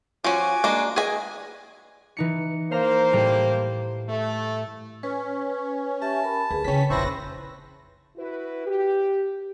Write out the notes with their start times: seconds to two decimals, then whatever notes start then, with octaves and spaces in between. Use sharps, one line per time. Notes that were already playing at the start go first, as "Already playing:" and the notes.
0.24 F3 C#4 F#4 G#5 D6
0.64 G#3 A#3 D4
0.96 G#4 B4 D#5 G#5
2.17 E3 D#4 C#7
2.72 A#3 C5 F5 A#5
3.13 A2 G3 G4
4.08 A3
5.03 C#4 B4
6.01 G4 E5 G#5 A5
6.23 A#4 B5
6.51 D2 G#4 B4
6.64 C#3 E3 C#4 C#5 G5 B6
6.90 F1 A#1 C#4 E4 B4 C5 C#6 A#6
8.17 E4 F#4 B4
8.67 G4